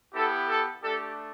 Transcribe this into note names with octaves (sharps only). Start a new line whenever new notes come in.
B3 E4 G4 A4
A4
A3 D4 G4 A4